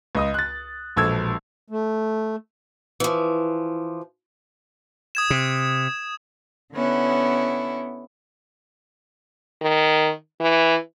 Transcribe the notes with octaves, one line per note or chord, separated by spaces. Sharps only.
C#2 D#5 D#6
F#6 A6
E1 A#1 A4 E6 G#6
A3
E3 F3
D#6 G#6 E7
C3
D3 B3 C#4 E4
D#3
E3